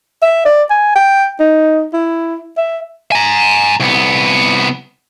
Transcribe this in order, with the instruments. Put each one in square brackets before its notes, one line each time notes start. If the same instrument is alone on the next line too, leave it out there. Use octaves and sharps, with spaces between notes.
[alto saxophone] E5
D5
G#5
G5
D#4
E4
E5
[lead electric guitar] G#5 A#5
C2 B3